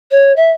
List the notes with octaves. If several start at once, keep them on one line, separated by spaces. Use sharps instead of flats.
C#5
E5